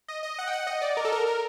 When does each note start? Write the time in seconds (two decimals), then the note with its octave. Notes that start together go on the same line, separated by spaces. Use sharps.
0.08 D#5
0.23 D#5
0.39 F#5
0.47 G5
0.53 F#5
0.67 D#5
0.82 D5
0.97 A#4
1.05 A4
1.12 A#4
1.26 A#4